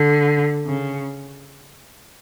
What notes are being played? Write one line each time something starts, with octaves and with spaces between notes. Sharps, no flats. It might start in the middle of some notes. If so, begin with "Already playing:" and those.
Already playing: D3
C#3